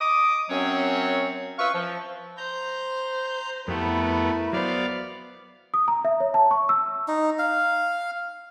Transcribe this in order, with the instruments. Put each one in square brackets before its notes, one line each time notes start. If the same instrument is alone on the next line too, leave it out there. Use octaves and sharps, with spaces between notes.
[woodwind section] D#5 D6 D#6
F#2 F#3 C4 C#4 C#5
F4 B4 E5 F5 C#6
F3
[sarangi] C5 [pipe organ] A#5 G6
[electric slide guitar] F2 G4 F#5 [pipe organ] A3 B3 [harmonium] E4 A#4 [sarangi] B4
[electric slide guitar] F#3 C5 [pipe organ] B3 D5 F5
[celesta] D#6
A#5
E5
C#5
A5
C#6
E6
[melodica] D#4
F5